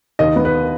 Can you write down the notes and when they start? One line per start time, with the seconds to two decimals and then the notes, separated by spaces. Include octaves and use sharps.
0.19 D#2 D#5
0.36 B3
0.45 B4